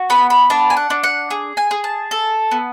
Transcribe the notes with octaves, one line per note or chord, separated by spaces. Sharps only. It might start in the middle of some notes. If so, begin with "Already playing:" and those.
Already playing: F#4
B3 B5
B5
D4 A5
G#5
F#5
D4
F#5
G#4
G#5
G#4
A5
A4
B3